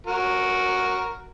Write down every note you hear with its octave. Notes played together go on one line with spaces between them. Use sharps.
F#4 A#4